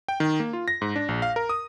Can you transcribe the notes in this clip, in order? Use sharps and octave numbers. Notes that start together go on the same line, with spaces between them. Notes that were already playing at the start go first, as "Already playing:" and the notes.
G5
D#3
A#3
F4
A#6
G#2
D4
A#1
F5
A#4
D#6